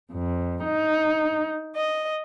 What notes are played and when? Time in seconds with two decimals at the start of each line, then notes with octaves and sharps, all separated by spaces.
0.14 F2
0.64 D#4
1.74 D#5